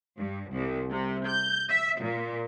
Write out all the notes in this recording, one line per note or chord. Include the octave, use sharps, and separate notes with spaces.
G2
C2
C3
G6
E5
A#2